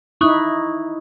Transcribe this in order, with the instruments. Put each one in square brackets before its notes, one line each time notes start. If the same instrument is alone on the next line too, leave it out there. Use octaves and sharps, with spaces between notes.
[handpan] D#4 E4 [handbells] C#6 D#6 F#6